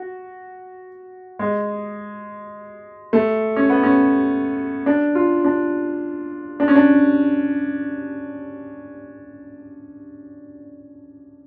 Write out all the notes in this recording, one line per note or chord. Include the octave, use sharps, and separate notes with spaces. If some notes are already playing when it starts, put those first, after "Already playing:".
Already playing: F#4
G#3
A3
C#4
B3
C#4
D4
F4
D4
D4
C#4
D4